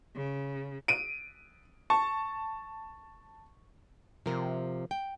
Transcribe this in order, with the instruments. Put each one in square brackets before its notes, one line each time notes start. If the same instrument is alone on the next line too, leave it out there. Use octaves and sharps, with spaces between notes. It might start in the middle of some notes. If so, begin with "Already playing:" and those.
[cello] C#3
[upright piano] D7 D#7
[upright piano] A5 [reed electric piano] C#6
[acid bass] C3 [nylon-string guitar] F3 A#4
[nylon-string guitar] G5